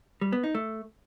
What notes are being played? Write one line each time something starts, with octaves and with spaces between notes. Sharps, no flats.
G3
B3
D#4
A3